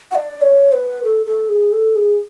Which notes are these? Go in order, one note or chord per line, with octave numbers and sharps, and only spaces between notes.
F#5
D5
C#5
B4
A4
A4
G#4
A4
G#4